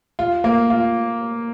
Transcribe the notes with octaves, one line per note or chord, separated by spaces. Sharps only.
F4
A#3
F4